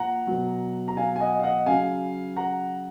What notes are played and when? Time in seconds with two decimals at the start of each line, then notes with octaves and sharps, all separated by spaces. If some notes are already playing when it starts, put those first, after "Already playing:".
Already playing: A#2 F3 F#5 A#5
0.27 B2 F#3
0.88 A#5
0.97 F5 G#5
1.16 G#5
1.21 D#5 F#5
1.40 F5
1.43 D#5 F#5
1.66 C#3 F#3 F5 G#5
2.36 F#5 A#5